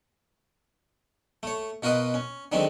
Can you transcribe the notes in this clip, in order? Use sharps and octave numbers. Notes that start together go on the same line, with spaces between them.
A3 C#5
B2 F4 F#4 A#4 B4 D#5
C#4
D3 D#3 F#3 G#3 C4 G4